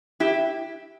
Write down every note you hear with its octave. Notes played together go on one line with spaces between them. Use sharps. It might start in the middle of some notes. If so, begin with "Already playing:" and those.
E4 G4